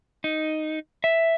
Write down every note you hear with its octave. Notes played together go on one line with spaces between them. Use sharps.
D#4
E5